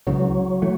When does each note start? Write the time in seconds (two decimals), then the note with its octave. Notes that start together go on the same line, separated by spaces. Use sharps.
0.07 C#2 C#3 E3 F#3
0.62 E3 A3